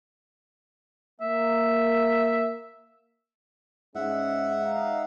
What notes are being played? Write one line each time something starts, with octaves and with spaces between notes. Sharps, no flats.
A#3 E5
G#2 G#3 C#4 E5 F#5
D#4 F5